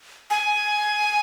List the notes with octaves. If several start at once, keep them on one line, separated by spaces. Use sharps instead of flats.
G#5